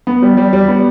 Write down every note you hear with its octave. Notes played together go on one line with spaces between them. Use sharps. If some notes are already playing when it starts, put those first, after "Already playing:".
B3
G3
G3
G3
B3